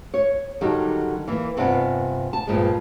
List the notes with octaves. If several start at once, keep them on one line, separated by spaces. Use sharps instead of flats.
C#5
D3 D#3 F#3 G3
E3 A#3
G2 C3 B3 F4 D5 G#5
A5
G2 A#2 F3 G#3